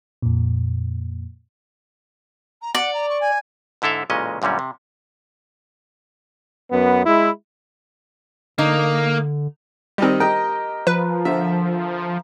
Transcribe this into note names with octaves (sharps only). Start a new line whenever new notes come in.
F2 A#2
A#5
D5 F#5
A#5
C#6
G#5
G#2 D3 E4 A4 E5 F5
A1 A#2 C#3 G#3 C#4 D#5
F#2 A#2 D3 G3 C#4
C3
F#2 B3
G#3 E4
D3 A#3 D#4
D#3 G3 C4 D#4 G4
G4 A#4 D#5 G5
F3 B4
D3 E5